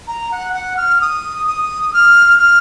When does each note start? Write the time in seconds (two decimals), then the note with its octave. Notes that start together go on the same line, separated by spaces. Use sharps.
0.08 A#5
0.32 F#5
0.54 F#5
0.77 F6
1.01 D#6
1.47 D#6
1.94 F6
2.39 F6